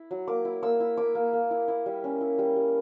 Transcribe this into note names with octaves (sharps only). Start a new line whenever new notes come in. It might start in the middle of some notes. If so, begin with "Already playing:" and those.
Already playing: E4
F#3
A#3 D6
E4
A#3 E6
E4
A#3 D6
A#3
A#3
E4
E4
G3
C#4
E4
G3
G3